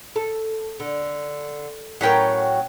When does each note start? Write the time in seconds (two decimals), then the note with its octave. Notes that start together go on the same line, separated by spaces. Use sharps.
0.16 A4
0.80 D3
2.01 A2 F#3 C#4 A#4 G5